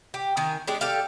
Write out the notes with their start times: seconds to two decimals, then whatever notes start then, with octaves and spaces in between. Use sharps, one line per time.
0.14 G4
0.37 D#3 G#5
0.68 G#3 D4 G4
0.81 G4 A4 D5 F5